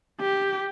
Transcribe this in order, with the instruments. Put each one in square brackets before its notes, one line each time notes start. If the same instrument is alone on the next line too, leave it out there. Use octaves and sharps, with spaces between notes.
[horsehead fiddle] G4